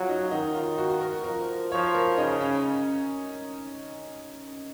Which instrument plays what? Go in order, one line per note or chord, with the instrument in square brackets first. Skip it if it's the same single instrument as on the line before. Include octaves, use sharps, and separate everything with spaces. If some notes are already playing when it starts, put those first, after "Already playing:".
Already playing: [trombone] F#3 [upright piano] F4 G#4
[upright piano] D#4
[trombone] D#3 [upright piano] D#4
[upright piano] F4
F#4
A#4
[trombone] F3 [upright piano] A#4
[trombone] F3 [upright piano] C#5
[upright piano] A#4
[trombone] C#3 [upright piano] D#4
[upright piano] C#4